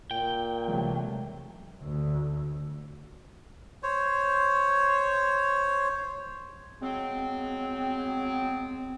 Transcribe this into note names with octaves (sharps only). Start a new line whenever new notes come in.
A#2 G5
C2 C3 E3 F#3 G#3 A3
D2
C5 C#5
F#3 G#3 B3 C4